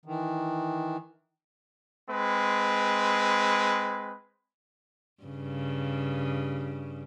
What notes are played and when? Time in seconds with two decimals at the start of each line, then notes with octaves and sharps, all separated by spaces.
0.05 D#3 E3
2.10 G#3 C4 B4
5.23 G2 C#3